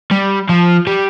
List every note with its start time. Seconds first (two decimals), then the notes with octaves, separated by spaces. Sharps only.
0.12 G3
0.49 F3
0.87 G3